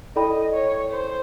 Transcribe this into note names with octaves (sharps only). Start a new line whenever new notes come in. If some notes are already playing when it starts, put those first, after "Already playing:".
E4 A4 D5 D#5 G5 B5
C#5
C5